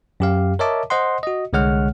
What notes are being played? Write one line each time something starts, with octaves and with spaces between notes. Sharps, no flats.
F#2 G4 F5
A#4 C#5 D#5 E5 A5 D6
C5 D#5 F#5 C6
F#4 D#5
C2 D3 G#3 C#5 F#5 F6